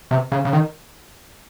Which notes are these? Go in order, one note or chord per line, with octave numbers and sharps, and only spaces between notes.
C3
C#3
C#3
D#3